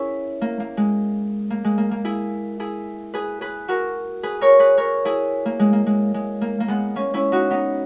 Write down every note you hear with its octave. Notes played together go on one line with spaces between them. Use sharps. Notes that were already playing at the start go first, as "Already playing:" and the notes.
Already playing: C#4 E4 G#4 A#4
A#3
A#3
G#3
A#3
G#3
A#3
A#3
E4 G#4
E4 G#4
G#4 B4
G#4 B4
F#4 A#4
G#4 B4
A#4 C#5
G#4 B4
A#4 C#5
E4 G#4
A#3
G#3
A#3
G#3
G#3
A#3
A#3
G#3 B3
A#3 C#4
C#4 E4
D#4 F#4
B3 D#4